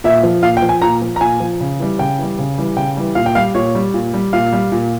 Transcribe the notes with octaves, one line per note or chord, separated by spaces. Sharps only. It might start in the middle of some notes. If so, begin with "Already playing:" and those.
A#2 E5
F3
A#2 F5
G5
F3
G#5
A#2 A#5
F3
A#5
A#2 G#5
F3
C#3
E3 G3
C#3 G5
E3 G3
C#3
E3 G3
C#3 G5
E3 G3
A#2 F5
G5
G3 F5
A#2 C#5
G3
A#2
G3
A#2 F5
G3
A#2